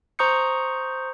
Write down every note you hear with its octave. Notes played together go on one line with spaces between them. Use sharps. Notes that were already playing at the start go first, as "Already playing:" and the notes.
C5 A#5 C#6 D#6 G6 C#7